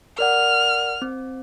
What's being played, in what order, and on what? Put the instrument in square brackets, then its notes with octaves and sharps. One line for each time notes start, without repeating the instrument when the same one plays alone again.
[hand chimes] A#4 D5 F#5 [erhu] F6
[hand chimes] C4